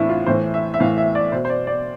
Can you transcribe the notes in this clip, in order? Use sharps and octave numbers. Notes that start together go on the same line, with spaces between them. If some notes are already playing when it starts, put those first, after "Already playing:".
Already playing: A2 E3 C4 D4 E4
F4
A2 E3 C5
E5
E5
A2 E3 F5
E5
D5
B2 C5
C5
D5
D5